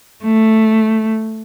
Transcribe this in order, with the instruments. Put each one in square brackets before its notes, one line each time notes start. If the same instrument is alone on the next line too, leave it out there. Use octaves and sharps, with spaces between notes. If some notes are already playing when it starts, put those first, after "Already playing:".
[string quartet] A3